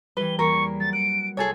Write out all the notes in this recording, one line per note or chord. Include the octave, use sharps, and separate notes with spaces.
E3 G3 B4 G7
E2 A#3 A#4 B4 C#6
F#3 A6
F#6 C#7 D7
C2 G#4 A4 C#5 G#5